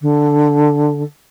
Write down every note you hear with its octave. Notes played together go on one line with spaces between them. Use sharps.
D3